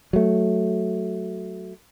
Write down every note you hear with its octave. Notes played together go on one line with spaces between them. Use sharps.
F#3 A3